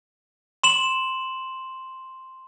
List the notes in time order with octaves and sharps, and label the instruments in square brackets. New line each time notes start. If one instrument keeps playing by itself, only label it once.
[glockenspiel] C6 E7 F#7